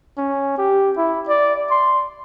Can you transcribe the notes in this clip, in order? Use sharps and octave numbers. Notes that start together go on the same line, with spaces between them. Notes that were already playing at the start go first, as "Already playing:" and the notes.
C#4
G4
E4
D5
C6